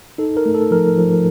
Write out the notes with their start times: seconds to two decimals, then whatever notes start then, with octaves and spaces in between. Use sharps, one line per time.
0.18 D#4 A4
0.37 A#4
0.46 A3
0.55 A4
0.71 F3 A#4
0.98 F3